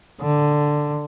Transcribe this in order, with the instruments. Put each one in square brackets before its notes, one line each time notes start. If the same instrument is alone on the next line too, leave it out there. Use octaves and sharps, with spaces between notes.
[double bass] D3